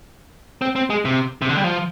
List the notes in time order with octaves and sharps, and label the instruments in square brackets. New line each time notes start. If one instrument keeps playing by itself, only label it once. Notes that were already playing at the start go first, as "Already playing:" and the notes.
[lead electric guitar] C4
C4
G#3
C3
C3
D3
G3
F3